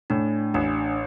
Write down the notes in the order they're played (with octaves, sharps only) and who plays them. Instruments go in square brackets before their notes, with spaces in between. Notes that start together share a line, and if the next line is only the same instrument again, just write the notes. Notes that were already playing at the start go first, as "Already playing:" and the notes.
[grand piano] A2 [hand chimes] D4
[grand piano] A1 [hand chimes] D4